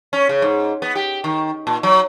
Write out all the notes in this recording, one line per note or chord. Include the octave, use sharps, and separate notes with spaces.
C#4
C#3
G#2
B3
G4
D#3
A#2
F#3